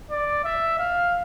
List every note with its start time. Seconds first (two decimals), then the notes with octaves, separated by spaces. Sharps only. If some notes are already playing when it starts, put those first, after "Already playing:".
0.10 D5
0.45 E5
0.79 F5